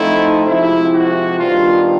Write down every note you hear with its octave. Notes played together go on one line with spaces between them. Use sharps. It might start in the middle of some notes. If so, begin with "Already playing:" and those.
Already playing: F3 A3 C4 D#4 E4
C3 F3 G#3 E4
F#4
D#3 G3 B3 D4 F4